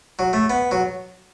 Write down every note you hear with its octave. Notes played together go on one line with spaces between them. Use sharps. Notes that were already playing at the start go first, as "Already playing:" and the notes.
F#3
A3
B3
F#3